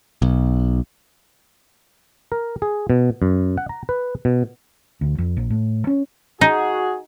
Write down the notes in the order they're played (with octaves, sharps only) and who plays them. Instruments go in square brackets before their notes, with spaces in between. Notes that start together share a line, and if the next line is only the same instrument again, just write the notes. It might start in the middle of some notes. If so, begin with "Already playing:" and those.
[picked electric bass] B1
[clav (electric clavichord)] A#4
G#4
B2
F#2
F#5
A#5
B4
B2
[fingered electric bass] D2
F2
A#1
A2
C#4
[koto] D#4 [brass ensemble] F#4 G#4